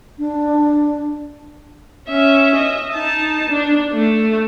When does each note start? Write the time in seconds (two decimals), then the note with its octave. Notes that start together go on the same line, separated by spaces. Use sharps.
0.18 D4
2.08 C#4 E5
2.55 D#5 E5
2.92 D#4 A5
3.50 D4
3.93 A3